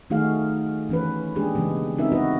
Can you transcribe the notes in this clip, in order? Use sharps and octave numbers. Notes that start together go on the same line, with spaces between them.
D#3 A3 D#4 F#4 G#4 F5
E3 C#4 B4
G3 G#3 A#3 D4 G4 G#4
C#3 E3 G3 G#3 B3
C4 C#4 D#4 F#4 A#4 E5
F#4 B4 D#5